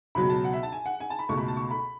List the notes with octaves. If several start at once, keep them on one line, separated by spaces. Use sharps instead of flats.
C#2 B2 F#3 B5
A5
F#5
E5
A5
G#5
F#5
G#5
A5
B5
C#2 B2 A3 C#6
B5
A5
C#6
B5